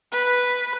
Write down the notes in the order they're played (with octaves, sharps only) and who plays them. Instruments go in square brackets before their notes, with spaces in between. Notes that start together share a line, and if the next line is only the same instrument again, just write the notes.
[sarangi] B4